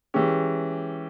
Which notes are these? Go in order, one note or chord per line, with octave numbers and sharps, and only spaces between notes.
E3 G#3 C#4 G4